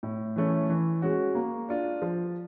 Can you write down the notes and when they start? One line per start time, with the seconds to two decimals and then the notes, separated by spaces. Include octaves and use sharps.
0.03 A2
0.36 E3 A3 C#4
0.69 E3
1.02 G#3 C#4 F#4
1.35 A#3
1.69 D4 F4
2.02 F3